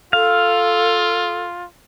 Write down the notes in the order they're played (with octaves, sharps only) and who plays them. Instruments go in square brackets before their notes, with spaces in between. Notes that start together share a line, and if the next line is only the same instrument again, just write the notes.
[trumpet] F4 [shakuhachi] A4 [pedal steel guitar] F5